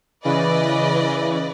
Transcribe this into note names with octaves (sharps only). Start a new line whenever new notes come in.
C#3 E3 B4 D5 D#5